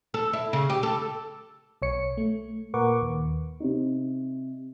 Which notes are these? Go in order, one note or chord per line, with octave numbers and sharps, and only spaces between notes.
A4
E4
C#3
G4
A4
B1 C#5 C#7
A3
A#2 A#4 B4 F#5 C#6 D6
D#2
C3 D#4